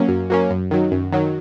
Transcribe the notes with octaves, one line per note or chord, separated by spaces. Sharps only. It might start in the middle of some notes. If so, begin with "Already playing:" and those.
Already playing: F#3 A#3 C#4
F#2
F#3 A#3 C#4
F#2
D#3 F#3
F#2
D#3 F#3